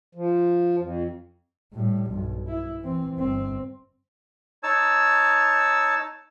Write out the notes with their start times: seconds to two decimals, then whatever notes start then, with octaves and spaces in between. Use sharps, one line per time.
0.15 F3
0.79 F2
1.73 A2 G3
2.09 B1 G2
2.47 E4
2.81 E3 C4
3.17 G1 C4
4.63 D#4 C#5 A5 E6